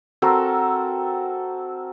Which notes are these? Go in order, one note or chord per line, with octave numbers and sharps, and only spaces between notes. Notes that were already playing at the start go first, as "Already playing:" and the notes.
C4 F#4 A4 A#4